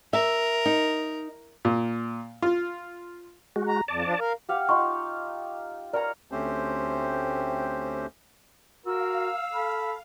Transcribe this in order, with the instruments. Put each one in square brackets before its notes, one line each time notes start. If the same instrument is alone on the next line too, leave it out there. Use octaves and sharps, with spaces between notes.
[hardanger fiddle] A#4 [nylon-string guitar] E5
[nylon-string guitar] D#4
[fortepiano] A#2
F4
[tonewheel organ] G#3 F#4
[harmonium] A#5
[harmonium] F2 [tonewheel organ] D5 A5
[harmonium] F3 D4
A#4 F5
[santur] G4 F5 F#5
[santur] D#4 F4 [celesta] C6 C#6
[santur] A#4 C#5 A#5 [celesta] D5
[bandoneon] D2 A3 C4 C#4 G4 C5
[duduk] F#4 [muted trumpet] A#4 [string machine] F5 [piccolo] E6
[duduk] A4 [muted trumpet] B5